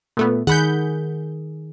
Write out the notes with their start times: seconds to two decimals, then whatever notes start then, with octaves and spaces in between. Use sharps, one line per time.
0.17 A#2 A3 B3
0.47 D#3 G#4 F#5 B5 G6